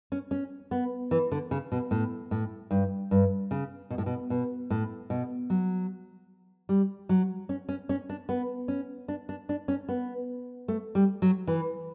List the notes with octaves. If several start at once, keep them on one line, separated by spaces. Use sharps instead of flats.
C#4
C#4
B3
E3
D3
C#3
B2
A2
A2
G2
G2
C#3
B2
A2
B2
B2
A2
B2
F#3
G3
F#3
C#4
C#4
C#4
D4
B3
C#4
D4
D4
D4
C#4
B3
A3
G3
F#3
E3